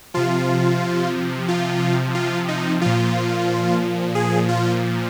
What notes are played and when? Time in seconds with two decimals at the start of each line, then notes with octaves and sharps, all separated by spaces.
0.14 C3 F3 F4
1.48 F4
2.15 F4
2.48 D#4
2.81 A#2 F3 F4
4.15 G#4
4.49 F4